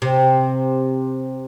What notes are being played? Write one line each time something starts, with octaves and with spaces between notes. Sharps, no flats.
C3